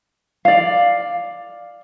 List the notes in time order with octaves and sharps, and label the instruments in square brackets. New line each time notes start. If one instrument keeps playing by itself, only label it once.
[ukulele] D5 F5